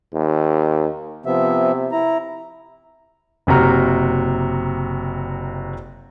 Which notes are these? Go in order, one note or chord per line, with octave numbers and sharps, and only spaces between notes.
D#2
C3 F3 B3 E5
E4 A#5
F#1 C3 F#4 A#5 F6